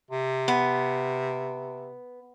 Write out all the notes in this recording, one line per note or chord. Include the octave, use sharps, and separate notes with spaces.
C3
B3